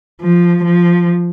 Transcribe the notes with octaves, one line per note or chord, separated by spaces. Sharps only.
F3
F3